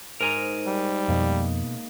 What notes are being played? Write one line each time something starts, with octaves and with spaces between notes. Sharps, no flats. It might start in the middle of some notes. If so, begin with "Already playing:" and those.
G#2 A#4 G#5 A#5
G3
F2 B2 A#3 D#5